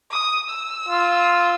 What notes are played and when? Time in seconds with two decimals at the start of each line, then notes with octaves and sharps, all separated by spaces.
0.11 D#6
0.50 E6
0.89 F4